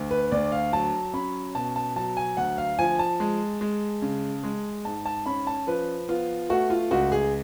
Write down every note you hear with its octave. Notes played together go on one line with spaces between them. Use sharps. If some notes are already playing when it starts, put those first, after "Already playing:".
Already playing: D2
B4
D2 D5
F5
F#3 A5
C#4 B5
B2 A5
A5
F#3 A5
G#5
D2 F#5
F5
F3 G#5
A5
G#3
G#3
C#3
G#3
G#2 A5
A5
C#4 B5
A5
F3 B4
B3 F4
A3 F#4
F4
C#2 F#4
G#4